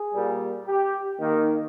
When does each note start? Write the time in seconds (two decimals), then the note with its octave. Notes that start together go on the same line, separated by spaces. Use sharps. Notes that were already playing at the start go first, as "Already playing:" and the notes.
Already playing: G#4
0.13 A#2 G3 A#3
0.65 G4
1.19 D#3 A#3